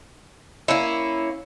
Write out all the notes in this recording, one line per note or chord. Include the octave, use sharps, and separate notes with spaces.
A#3 C#4 E4